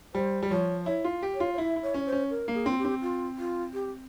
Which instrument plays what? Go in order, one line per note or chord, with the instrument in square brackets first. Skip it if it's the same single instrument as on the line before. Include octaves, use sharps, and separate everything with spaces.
[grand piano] G3 [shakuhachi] C5
[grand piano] G3
[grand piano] F3 [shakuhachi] C#5
[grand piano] E4 [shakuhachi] C#5
[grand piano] F4
G4
[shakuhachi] C#5
[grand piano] F4
[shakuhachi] C#5
[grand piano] E4 [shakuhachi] E5
[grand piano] E4
[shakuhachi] C#5
[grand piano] C#4
[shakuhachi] C5
[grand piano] C#4
[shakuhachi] A#4
[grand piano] A#3
[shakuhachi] G#4
[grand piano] C4 [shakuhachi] F4
[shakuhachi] G4
[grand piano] C4
[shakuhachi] F4
F4
G4